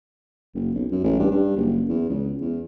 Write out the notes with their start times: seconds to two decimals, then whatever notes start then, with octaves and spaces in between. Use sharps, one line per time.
0.54 F#1
0.74 B1
0.91 F#2
1.04 A1
1.19 G2
1.31 G2
1.56 F#1
1.88 E2
2.09 C#2
2.41 E2